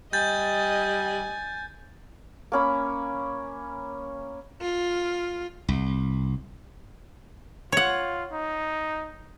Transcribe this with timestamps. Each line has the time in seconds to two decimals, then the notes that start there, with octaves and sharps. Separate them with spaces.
0.13 G3 D#5 G#5 G6 A6
2.52 A#3 C#4 B5
4.63 F4
5.68 C2
7.72 F4 C#5 F#5
8.32 D#4